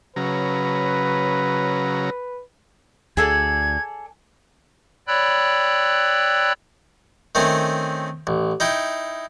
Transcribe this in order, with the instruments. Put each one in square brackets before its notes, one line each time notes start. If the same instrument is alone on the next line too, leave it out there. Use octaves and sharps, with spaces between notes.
[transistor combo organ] C#3 F#3 A#5 [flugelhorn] B4
[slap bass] D2 [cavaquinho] G#4 A4 D5 [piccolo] G#6
[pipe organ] C#5 D5 G5 B5 E6 F#6
[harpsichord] D#3 A3 C4 C#4
A1
D#4 E4 G5 C#6